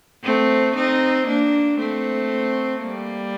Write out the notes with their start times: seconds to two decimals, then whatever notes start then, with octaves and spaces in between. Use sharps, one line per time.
0.23 A3 C4
0.76 C4 D#4
1.27 A#3 D4
1.79 A3 C4
2.82 G3 A#3